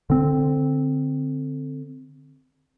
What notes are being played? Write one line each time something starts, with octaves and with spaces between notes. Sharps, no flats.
D3 C4